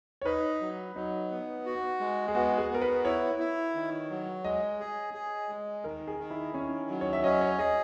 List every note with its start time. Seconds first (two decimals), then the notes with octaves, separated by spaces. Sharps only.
0.21 C#5
0.25 D#4 B4
0.61 F#3
0.96 F#3 D#4
1.31 B3
1.66 F#4
2.00 G#3
2.28 G#4
2.35 B3 F#4
2.58 G#4
2.70 B3 A#4
2.81 B4
3.05 E4 C#5
3.39 E4
3.75 D#3
4.10 F#3
4.44 G#3 D#5
4.80 G#4
5.14 G#4
5.49 G#3
5.84 D#3 A#4
6.07 G#4
6.19 D#3
6.31 E4
6.54 D#3 C#4
6.89 F#3
7.01 C#5
7.13 E5
7.24 C#4 D#5
7.41 C#5
7.58 G#4 D#5